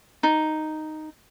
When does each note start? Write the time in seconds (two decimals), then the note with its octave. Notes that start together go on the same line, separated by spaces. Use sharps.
0.23 D#4